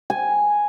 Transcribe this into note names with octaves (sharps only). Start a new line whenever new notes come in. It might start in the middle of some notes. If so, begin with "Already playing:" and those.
G#5